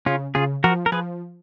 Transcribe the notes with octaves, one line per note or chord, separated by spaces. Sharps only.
C#3 C#4 F4
C#3 F4 G#4
F3 F#4 A#4
A#4
F3 G#4 B4